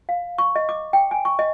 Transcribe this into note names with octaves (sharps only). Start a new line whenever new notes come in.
F5
C#6
D#5
D6
G5
G#5
C#6
D#5